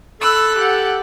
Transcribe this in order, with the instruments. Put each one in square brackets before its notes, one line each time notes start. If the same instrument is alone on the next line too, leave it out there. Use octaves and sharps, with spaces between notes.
[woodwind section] A4 [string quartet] B5 E6 F#6
[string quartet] G4 F#5